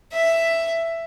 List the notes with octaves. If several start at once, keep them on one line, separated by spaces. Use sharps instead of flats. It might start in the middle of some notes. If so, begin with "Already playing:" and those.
E5